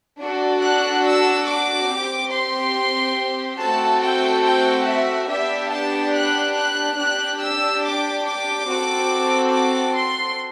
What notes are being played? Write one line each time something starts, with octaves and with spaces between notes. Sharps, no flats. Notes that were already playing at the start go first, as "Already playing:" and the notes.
D4 F#4 A4
F#6
E6
D6
C4 G4
C6
A3 C4 F#4 A4 A5
G5
G5
E5
B3 D4 G4 E5
A5
F#6
F#6
D4 G4 F#6
E6
D6
D6
C4 F#4 A4
D6
C6